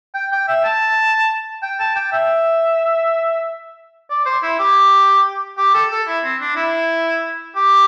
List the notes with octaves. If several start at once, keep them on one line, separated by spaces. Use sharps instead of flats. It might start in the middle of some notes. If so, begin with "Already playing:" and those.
G5
G5
E5
A5
G5
A5
G5
E5
D5
C5
E4
G4
G4
A4
A4
E4
C4
D4
E4
G4